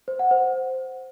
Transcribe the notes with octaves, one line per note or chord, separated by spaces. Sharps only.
C5
F#5
C5